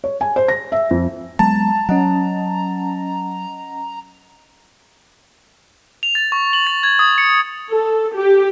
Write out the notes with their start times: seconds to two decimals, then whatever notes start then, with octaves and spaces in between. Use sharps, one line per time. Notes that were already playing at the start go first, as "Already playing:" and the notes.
0.04 C#5
0.21 G#5
0.36 C5
0.48 A#6
0.72 E5
0.91 F2
1.39 F#3 G#3 B3 A5 A#5
1.89 F#3 C#4 D#5 F#5
6.03 F7
6.15 A6
6.32 C#6
6.53 F#7
6.67 A6
6.83 G#6
6.99 D#6
7.18 C#7
7.71 A4
8.15 G4